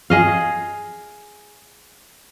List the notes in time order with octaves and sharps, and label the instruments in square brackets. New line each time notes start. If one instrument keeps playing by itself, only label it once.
[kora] G#4 D#5 F5